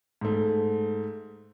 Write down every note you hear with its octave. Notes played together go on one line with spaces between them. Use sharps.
G#2 A3